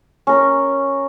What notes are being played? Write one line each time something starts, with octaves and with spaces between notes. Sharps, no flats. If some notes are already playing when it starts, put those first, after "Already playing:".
C#4 A#4